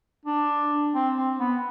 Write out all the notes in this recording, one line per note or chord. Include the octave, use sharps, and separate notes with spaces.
D4
C4
C4
B3